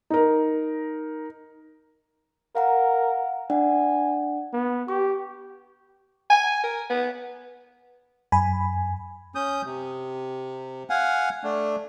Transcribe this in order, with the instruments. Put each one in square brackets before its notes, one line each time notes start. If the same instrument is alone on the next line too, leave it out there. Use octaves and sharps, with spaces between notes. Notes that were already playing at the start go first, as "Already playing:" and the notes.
[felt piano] D#4 A#4
[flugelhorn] A#4 [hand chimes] F5 F#5 A#5
[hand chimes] D4 D5 F#5 [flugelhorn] G#5
[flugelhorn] B3
[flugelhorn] G4 [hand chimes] C#6
[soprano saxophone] G#5
A#4
B3
[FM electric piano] F#2 G#5 B5
[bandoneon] C#4 D#6 G6
C3
F5 F#5 G#5
A3 D4